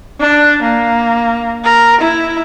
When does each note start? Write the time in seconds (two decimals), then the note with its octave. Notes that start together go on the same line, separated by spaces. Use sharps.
0.20 D4
0.63 A#3
1.64 A#4
2.01 E4